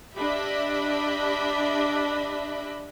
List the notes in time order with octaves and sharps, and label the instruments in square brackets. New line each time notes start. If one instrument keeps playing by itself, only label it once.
[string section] D4 G4 D#5 E5 B5